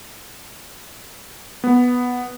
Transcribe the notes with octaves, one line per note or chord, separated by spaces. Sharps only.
B3